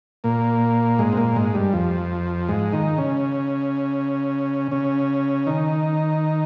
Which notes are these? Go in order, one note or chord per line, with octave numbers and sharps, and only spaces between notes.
A#2 A#3
G#2 G#3
C4
A#2 A#3
G#2 G#3
G2 G3
F2 F3
G#2 G#3
D#3 D#4
C#3 C#4
C#3 C#4
D#3 D#4